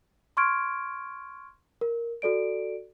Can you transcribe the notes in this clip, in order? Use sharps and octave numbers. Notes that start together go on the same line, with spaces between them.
C6 C#6 F6 G#6 D7
A#4
F#4 A4 D5 D7